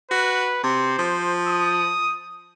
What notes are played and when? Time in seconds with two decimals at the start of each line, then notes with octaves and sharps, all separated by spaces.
0.11 F#4 B4
0.64 C3 C5
0.99 F3
1.48 D#6